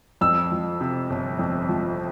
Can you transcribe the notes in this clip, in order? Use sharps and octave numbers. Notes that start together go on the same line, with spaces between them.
F2 E6
F3
C3
G1
F2
F3